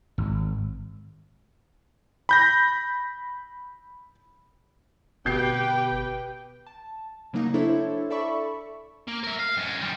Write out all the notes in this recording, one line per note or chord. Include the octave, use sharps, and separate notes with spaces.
G#1
B5 G6 A#6
G1 B2 G4 B4 G5 G6 C7
A5
C#3 F#3 A#3 D#4
D4 E4 A4 C5 C#5 E5
A4 D5 E5 B5 C#6
A#3
A#4 E5
F5
F#2 G#3
D#3 G3